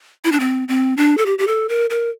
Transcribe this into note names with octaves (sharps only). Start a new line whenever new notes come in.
E4
D4
C4
C4
D4
A4
G4
G4
A4
A#4
A#4